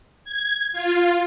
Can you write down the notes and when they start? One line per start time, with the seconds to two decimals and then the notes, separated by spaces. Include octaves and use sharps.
0.24 G#6
0.73 F4